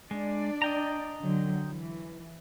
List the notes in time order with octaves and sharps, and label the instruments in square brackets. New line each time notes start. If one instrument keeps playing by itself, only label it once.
[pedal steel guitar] G#3 [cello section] D4 D5
[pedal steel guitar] D#5 G5 A#5
[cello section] D3 F#3
E3